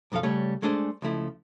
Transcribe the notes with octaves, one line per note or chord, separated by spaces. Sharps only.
B1 F#2 F3 A4 F5
C#3 G3 A3 C#4 C#5
G#3 A3 D4 G#4 C5
C#2 F3 A3 E4